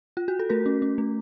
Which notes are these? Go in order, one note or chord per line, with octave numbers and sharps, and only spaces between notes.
F4
F#4
A4
A3 F#4 A#4
C#4
C#4
A3